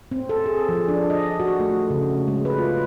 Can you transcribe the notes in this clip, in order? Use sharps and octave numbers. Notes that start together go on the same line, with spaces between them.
C4
A4
G#4
F3
D4
D#5
F#4
A3
C#3
G#3
B4
F4